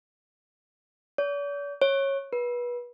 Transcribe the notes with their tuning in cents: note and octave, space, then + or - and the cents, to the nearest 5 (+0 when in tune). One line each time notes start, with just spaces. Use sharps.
D5 -45
C#5 -15
B4 -30